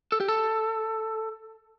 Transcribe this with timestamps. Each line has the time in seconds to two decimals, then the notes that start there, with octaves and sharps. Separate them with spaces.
0.12 A4
0.20 G4
0.28 A4